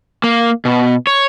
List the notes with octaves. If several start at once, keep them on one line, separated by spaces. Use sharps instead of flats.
A#3
B2
C#5